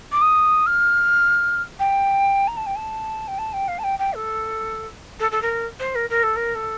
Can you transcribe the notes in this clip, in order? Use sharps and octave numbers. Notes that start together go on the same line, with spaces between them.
D6
D#6
F6
G5
A#5
A5
G5
A5
G5
A5
G5
F5
A5
G5
G5
A4
A4
A4
A#4
C5
A#4
A#4
A4
A#4
A4